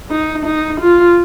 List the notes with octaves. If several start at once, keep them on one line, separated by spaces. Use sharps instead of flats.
D#4
D#4
F4